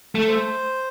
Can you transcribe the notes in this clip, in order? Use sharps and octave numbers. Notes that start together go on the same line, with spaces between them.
A3
C5